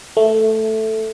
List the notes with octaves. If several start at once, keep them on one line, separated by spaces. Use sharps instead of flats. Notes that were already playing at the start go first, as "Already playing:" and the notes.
A3